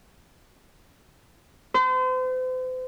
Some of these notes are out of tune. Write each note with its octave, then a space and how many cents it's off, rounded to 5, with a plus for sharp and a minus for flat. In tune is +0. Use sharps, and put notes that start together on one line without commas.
C5 -40